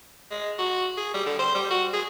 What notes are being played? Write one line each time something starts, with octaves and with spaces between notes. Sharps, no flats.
G#3
F#4
G#4
G3
D3
C5
G3
F#4
G#4